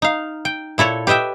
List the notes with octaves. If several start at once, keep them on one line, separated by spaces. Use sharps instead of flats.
D#4 F5
G5
A#2 E4 A4 C#5
G4 B4 D#5 E5 G5